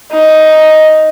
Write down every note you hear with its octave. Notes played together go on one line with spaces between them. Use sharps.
D#4